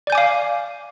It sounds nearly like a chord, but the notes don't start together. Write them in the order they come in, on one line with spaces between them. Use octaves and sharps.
D5 G6 G#5 D6 F5